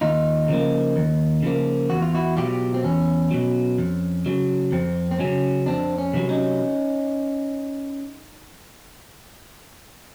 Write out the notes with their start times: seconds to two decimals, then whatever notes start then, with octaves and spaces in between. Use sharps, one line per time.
0.01 D#2 D#4 F4
0.48 C#3 F3 A#3
0.96 D#2
1.42 C#3 F3 A#3
1.90 E2 F#4
2.02 F4
2.15 E4 F#4
2.37 B2 F#3 F4 G4
2.74 C4
2.84 E2 C#4
3.31 B2 F#3
3.78 F2
4.26 C#3 F#3
4.72 F2 C4
5.11 C4
5.19 C#3 F#3 C#4
5.66 F2 C4 D4
5.98 C#4
6.13 C3 D#3 F#3
6.29 C#4 D#4